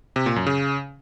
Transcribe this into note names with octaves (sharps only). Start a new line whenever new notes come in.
C3
A#2
F#2
C#3